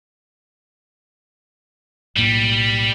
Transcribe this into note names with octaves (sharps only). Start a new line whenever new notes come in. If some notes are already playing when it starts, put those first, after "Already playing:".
B1 A2 G3 A#3